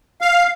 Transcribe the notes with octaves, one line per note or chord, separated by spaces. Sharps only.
F5